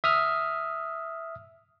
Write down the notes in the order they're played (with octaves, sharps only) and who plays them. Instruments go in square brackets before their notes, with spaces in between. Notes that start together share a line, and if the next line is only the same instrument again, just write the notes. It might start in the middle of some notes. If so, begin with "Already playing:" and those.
[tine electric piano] E5 D#6 F6